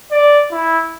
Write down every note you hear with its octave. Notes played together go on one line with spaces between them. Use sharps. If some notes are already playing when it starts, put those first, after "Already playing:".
D5
E4